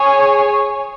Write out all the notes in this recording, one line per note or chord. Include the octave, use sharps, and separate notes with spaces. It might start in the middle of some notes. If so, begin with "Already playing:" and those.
Already playing: G#4 C#5 G#5